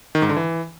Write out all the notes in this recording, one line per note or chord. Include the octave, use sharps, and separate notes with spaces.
D#3
G#2
D3
E3